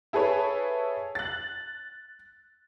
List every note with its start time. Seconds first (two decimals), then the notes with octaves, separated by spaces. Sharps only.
0.13 E4 G#4 A4 B4 C#5
1.15 F#6 A6